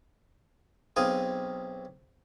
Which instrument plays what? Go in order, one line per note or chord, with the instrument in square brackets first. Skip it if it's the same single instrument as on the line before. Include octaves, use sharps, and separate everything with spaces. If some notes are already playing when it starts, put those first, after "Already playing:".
[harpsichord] B1 C4 G#4 F5 D#6